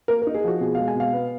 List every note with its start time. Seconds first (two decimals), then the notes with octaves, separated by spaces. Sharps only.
0.08 A#3 A#4
0.22 D#4 A#4
0.34 G#4
0.44 F3 F#4
0.60 B2 G#4
0.75 G#3 F5
0.88 G#5
0.95 B2 F5
1.13 B3